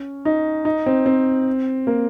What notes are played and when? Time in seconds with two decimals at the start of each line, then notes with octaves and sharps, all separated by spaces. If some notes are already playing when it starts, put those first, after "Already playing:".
Already playing: C#4
0.25 D#4
0.65 D#4
0.86 C4
1.06 C4
1.87 A#3